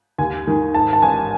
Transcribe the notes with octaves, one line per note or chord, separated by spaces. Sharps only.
D#2 G#5
D#3
G#2 A5
A5
A1 G#5